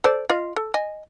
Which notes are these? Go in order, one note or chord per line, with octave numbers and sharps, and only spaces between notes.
A4 C5 D5
F4 D#5 F5
A4
D#5 G#5